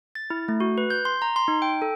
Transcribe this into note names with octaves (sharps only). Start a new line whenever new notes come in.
A6
E4
A3
F#4
B4
G6
C6
A#5
C6
D#4
G5
A4